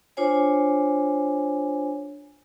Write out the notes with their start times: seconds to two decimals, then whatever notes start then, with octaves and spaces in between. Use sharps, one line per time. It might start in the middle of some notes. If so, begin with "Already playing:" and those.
0.17 D4 F4 C5 C#5 G#5